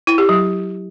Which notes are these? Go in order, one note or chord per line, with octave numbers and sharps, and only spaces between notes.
E4
G4
F#3